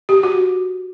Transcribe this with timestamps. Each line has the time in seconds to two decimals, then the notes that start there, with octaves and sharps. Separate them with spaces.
0.09 G4
0.23 F#4